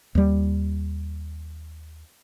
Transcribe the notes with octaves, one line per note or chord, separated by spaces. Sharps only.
D#2 G3